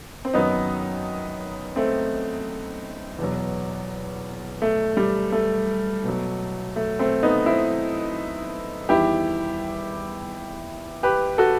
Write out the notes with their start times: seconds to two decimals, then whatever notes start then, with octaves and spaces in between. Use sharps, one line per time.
0.25 C4
0.34 F#2 D#3 F#3 B3 D#4
1.76 A3 C4
3.19 E2 B2 F#3
4.62 A3
4.97 G3
5.32 A3
6.04 B2 F#3
6.76 A3
6.99 A3 C4
7.23 B3 D#4
7.46 C4 E4
8.89 E2 D#3 G3 E4 G4
11.03 G4 B4
11.38 F#4 A4